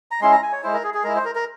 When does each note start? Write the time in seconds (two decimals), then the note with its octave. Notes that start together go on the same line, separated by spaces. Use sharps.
0.11 A#5
0.21 G#3 C#4 E4 C6
0.32 A#5
0.43 G#5
0.52 C#5
0.63 G#3 E4 C5
0.73 A#4
0.84 G#4
0.94 G#4
1.04 G#3 E4 A#4
1.15 C5
1.25 A#4
1.35 A#4